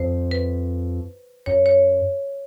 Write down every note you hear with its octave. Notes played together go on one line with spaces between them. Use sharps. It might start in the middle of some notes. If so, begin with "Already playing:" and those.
Already playing: F2 C5
B4
F#2 C#5
C#5